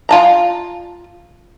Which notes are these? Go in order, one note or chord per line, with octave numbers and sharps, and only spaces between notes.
F4 A5 A#5